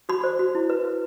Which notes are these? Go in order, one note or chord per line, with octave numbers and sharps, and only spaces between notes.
F#4 B5
C5
F#4
E4
B4
B4